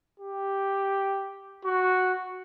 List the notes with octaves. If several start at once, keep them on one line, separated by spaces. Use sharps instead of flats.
G4
F#4